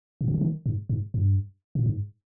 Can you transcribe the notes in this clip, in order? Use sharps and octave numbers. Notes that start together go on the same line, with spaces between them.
A#2
C3
C#3
D#3
G#2
G#2
G2
A#2
G#2